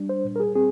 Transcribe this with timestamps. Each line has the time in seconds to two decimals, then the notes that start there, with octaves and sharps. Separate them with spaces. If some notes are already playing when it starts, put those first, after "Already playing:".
Already playing: G3 D4
0.09 C5
0.24 A#2
0.36 A#4
0.40 G#4
0.55 C4 G#4